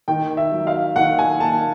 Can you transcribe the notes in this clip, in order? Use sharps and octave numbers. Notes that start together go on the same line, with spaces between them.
D#3 G5
E5
F#3
F5
D#3 F#5
G#5
A#3 A5